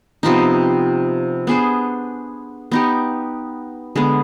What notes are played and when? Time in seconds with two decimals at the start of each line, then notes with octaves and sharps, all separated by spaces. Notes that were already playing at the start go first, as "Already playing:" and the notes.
0.23 C3 F3 B3 D#4
1.47 B3 D4 G#4 C5
2.72 B3 D#4 G4
3.95 D3 G#3 B3